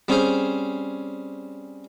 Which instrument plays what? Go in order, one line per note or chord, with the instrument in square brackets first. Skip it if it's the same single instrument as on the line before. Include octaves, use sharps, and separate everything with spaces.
[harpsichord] G3 C4 C#4 G#4 C5